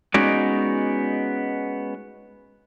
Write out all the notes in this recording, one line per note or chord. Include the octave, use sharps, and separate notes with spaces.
G#3 B3 C#4 D#4 F#4 D5